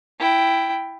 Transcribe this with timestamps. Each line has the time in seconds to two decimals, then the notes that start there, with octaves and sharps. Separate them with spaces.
0.20 E4 G5